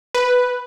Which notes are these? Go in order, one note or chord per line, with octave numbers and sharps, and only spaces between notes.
B4